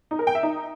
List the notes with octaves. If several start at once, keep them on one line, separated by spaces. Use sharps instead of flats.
D#4
A#4
G5
E5
D#4